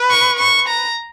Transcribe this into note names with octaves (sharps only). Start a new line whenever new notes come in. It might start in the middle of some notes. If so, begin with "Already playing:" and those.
Already playing: B4
C#6
C#6
A#5